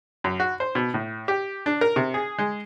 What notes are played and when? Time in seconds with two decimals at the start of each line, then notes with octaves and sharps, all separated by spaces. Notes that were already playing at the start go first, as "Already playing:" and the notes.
0.24 F#2
0.40 F#4
0.60 C5
0.75 B2
0.94 A2
1.28 G4
1.66 D4
1.81 A#4
1.96 C3
2.14 G#4
2.39 G#3